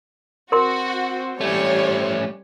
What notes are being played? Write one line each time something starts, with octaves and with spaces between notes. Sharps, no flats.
C4 F#4 A#4 C6
G3 A3 C#4 C#5